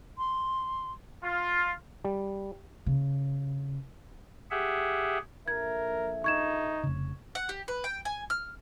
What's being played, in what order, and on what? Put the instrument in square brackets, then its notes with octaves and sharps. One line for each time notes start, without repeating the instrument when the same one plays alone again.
[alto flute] C6
[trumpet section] F4
[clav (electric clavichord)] G3
[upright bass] C#3
[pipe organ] G4 G#4 E5 F#5
[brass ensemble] A#1 A4 E5 [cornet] A#4 [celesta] G#6
[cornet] D#4 [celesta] C#6 G#6 E7
[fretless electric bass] F1 C#3
[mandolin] F#5
G4
B4
G5
G#5
F6